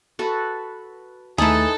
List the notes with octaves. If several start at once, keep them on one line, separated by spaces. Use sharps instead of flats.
F#4 A4 B4
D#2 E3 A3 D#4 G#4 A4 F#5